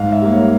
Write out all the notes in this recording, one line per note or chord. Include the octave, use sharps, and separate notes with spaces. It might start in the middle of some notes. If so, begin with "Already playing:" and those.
Already playing: G#2 F5
E5
G3 A#3
C#5